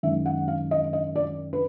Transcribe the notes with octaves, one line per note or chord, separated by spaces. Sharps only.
F#2 D#3 G#3 E5
F#5
F5
D#5
D#5
D5
B4